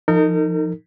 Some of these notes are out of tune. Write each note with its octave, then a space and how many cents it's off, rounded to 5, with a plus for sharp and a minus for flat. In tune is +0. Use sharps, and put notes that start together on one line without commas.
F3 -20 D#4 +0 A#4 -40